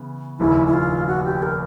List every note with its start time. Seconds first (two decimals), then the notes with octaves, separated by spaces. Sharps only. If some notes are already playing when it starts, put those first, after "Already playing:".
Already playing: C#3 E3 B3
0.40 F1 D#2 C#3 E4
0.67 E4
0.73 F4
1.08 F#4
1.24 G4
1.42 A#4